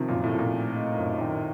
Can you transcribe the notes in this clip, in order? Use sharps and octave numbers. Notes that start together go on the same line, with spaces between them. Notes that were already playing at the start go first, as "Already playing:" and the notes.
Already playing: C3 D#3 F3
F#2 A#2
A2
F3
A#2
A3
D#4
F#2
D#3